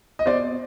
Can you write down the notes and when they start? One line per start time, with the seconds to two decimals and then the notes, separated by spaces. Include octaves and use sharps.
0.19 D#5
0.26 B2 C5 D5